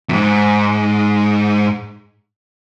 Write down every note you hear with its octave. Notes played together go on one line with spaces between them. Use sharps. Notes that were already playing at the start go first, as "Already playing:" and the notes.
F2 G#2